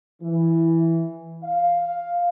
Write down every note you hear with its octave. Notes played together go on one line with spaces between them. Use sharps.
E3
F5